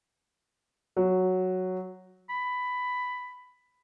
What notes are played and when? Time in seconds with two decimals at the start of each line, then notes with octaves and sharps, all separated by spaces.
0.97 F#3
2.30 B5